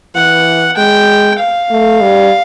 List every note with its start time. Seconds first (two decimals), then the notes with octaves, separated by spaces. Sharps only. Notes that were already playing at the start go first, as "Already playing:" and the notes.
0.15 E3 F#5
0.77 G#3 G5
1.39 F5
1.71 A3
2.01 G3